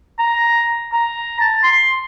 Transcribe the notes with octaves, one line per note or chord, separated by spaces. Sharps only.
A#5
A#5
A5
C6